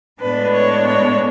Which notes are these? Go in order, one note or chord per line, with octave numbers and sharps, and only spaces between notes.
A2 G#3 B3 D4 B4
C#5
C#5